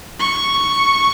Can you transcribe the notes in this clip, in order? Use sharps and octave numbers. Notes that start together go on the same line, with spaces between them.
C#6